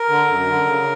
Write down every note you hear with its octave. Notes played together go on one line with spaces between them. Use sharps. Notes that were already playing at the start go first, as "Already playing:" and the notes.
Already playing: A#4
D3
F#2
D3
C#3